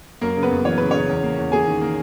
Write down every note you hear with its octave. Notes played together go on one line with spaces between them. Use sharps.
F#2 A#3 A#4
C#3
B3 B4
F#2
E3 C#5
C#3 B4
C#3 C#4 C#5
E2
A#3
E2
A#3 G#4 G#5
D#3
A#3